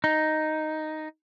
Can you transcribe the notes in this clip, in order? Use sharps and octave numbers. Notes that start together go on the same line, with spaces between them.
D#4